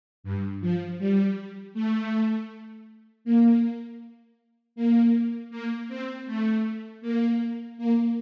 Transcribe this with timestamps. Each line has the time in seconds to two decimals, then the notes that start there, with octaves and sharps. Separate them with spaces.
0.24 G2
0.61 F3
0.99 G3
1.74 A3
3.25 A#3
4.76 A#3
5.51 A#3
5.88 C4
6.26 A3
7.02 A#3
7.78 A#3